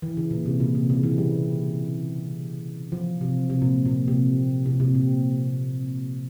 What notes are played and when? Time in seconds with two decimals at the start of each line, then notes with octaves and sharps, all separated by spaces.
0.02 E3
0.17 C#3
0.31 A#2
0.46 C3
0.60 A#2
0.75 C3
0.90 C#3
1.03 E3
1.18 G3
2.92 F3
3.21 C3
3.50 C3
3.62 A#2
3.85 A#2
4.08 C3
4.66 C3
4.80 C3
4.95 A#2